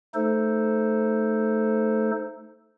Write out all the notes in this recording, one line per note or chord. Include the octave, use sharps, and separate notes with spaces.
A3 D#4 A4 C5